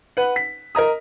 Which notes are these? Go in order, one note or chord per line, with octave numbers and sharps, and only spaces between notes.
B4 F#5
B6
A#4 D#5 A#5 D#6